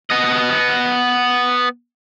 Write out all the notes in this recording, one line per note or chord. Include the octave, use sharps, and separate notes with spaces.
B3 D#5